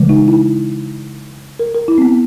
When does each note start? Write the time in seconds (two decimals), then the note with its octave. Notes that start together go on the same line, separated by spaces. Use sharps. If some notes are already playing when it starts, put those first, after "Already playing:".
Already playing: C#3 E3 G#3
0.09 D#4
0.28 E4
1.59 A#4
1.74 A#4
1.88 E4
1.98 C4
2.02 B3